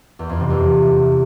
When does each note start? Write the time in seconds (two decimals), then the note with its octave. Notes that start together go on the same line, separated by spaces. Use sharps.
0.19 E2
0.29 F2
0.40 C3
0.50 E2